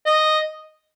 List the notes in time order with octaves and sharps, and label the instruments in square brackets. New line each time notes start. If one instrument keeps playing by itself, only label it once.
[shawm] D#5